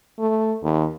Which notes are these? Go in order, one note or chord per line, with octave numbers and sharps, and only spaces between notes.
A3
D#2